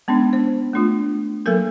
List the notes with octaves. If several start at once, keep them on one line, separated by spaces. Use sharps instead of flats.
G#3 B3 C#4 D4
C5
A3 D4 F4
F#3 A#3 A4 A#4